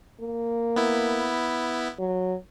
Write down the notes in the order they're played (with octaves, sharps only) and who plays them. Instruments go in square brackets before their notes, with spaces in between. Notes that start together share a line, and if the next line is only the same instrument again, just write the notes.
[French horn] A#3
[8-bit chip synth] B3 E4
[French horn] F#3